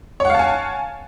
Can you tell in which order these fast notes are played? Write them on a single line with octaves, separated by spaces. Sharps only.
C#5 F#5 F5 A5 G#5